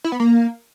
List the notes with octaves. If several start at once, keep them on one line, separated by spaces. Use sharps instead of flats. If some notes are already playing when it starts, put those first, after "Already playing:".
E4
B3
A#3